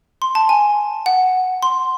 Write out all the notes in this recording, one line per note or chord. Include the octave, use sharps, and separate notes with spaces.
C6
A5
G#5
F#5
C6